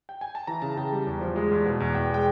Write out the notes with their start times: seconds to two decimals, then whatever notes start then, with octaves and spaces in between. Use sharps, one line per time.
0.09 G5
0.21 G#5
0.35 A5
0.47 E3 A#5
0.62 C#3 A5
0.77 C#3 G5
0.92 G3
1.07 E2
1.21 F3
1.36 G#3
1.51 E2
1.66 B2
1.80 E2
1.95 E2 G5
2.10 G#3 G5